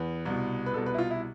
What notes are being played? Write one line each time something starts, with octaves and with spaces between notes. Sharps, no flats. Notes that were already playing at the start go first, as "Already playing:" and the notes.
Already playing: E2 B4
C2 B2
B4
C2 B2 A4
B4
E4
F4
E4